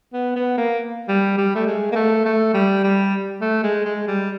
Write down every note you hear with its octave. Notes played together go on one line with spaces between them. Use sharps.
B3
B3
A#3
G3
G3
A3
G#3
A#3
A3
A3
G3
G3
A3
G#3
G#3
G3